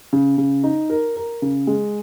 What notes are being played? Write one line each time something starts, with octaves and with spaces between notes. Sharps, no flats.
C#3
C#3
D#4
A#4
A#4
C#3
G#3